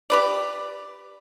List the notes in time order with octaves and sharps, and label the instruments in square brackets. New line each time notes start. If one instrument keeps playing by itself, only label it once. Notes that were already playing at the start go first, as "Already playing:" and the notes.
[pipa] G4 B4 D5